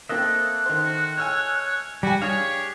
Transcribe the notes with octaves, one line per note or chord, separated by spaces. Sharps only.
A#3 C4 A4 D#5 E5 F#6
D#3 C5
F#4
C#5 G#5 E6 F6
G3 F#4 G5 G#5
D4 G4 G#4 C#5 F5